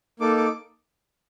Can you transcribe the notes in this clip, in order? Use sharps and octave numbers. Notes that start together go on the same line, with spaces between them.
A#3 D#4 A4 D6
D6